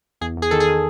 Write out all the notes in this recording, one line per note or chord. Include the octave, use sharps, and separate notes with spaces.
E2 G#4
E2 G#4
D#3 A4
G#4
D#3